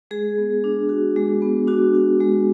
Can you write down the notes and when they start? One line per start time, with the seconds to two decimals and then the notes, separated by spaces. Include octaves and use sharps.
0.11 G#3 G#4
0.38 B3
0.64 D4
0.89 F#4
1.16 G#3
1.42 B3
1.68 D4 F#4
1.94 F#4
2.20 G#3